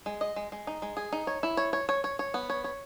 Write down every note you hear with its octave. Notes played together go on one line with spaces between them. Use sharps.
G#3
D#5
G#3
G#3
D#4
G#3
G#4
D#4
C#5
E4
C#5
C#5
C#5
C#5
C#5
B3
C#5
C#5